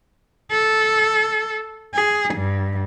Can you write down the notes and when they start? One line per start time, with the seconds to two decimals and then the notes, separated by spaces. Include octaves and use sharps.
0.51 A4
1.94 G#4
2.35 G2